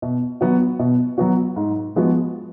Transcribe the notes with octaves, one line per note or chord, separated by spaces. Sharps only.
B2
F#3 B3 F#4
B2
F#3 B3 F#4
G#2
F3 G#3 B3 F#4